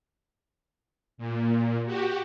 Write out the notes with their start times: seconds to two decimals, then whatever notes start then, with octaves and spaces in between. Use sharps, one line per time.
1.18 A#2
1.86 F#4 G4